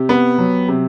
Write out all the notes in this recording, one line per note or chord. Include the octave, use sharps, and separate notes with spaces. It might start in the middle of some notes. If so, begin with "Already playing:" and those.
Already playing: C3 G4
B3
F#3
C3